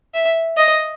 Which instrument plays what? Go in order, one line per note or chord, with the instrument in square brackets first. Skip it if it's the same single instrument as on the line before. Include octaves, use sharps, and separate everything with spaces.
[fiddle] E5
D#5